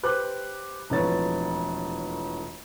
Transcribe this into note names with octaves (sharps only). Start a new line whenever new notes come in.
G4 B4 C5 D6 F#6
E1 F2 A2 B3 C#5 A6